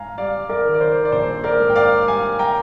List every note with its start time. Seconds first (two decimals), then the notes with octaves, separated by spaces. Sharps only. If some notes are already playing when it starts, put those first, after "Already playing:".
Already playing: G#2 F5 G#5 A#5
0.18 G3 D5 F5
0.50 A#4 D5
0.65 D#3
0.74 D5
0.81 C5
1.05 D5
1.12 A#1 C5
1.44 A#4 D5
1.60 G#2
1.70 G5
1.75 D5 F5
2.07 G3 F5 G#5
2.39 G5 A#5